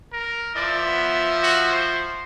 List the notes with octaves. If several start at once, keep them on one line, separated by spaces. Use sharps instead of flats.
A#4
F3 D5 E5
B3
F#4
C5